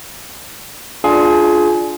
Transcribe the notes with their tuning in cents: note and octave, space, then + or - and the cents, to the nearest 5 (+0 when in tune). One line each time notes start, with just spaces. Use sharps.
D4 +5 F4 +0 G#4 +25